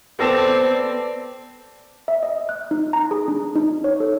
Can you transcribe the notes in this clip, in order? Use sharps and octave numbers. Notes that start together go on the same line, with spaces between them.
B3 C4 A4 D5 A5 A#6 E7
E5
D#5
F#6
D#4
A#5
G#4
D4
D#4
C#5
A4